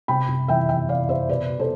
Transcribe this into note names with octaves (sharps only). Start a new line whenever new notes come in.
C3 G5 B5
C3
E3 E5 G5
E3 E5 G5
C3 D5 F5
C3 C5 E5
B2 B4 D5
B2
A4 C5